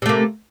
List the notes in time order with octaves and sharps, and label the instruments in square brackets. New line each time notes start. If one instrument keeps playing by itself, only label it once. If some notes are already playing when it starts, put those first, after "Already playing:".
[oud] C3
A3
A#3